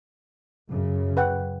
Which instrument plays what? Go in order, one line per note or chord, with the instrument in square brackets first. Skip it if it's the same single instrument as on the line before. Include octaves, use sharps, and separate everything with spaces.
[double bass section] F#2 C#3
[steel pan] B4 F#5 G5